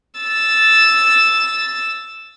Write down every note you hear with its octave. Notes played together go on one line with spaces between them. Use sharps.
E6 A6